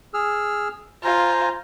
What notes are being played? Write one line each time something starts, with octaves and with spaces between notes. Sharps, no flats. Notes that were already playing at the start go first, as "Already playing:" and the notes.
G#4 E6 F6
F4 C5 G#5 A#5